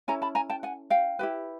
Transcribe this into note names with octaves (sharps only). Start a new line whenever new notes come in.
C#4 E4 A4 G#5 A#5
A5 B5
G#5 A#5
G5 A5
F#5 G#5
F5 G5
E4 G4 B4